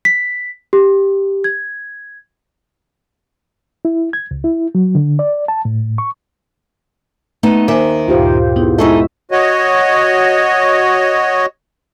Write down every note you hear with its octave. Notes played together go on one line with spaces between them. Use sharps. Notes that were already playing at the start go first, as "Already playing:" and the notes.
B6
G4
G#6
E4
G#6
C#2
E4
F#3
D3
D5
A5
A2
C#6
A3 B3 D#4
D#2 D#3 C5 E5 G#5 D6
D2 G2 A#2 F4 G4 C5
B3 D#4 E4 G#4
G#3 D#4 E4 G#4 A4 D#5 E5 C#6
F#4 C#5 D#5